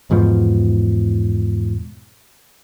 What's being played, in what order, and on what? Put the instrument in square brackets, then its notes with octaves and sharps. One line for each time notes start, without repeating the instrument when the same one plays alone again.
[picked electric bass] E2 G#2 B2 F3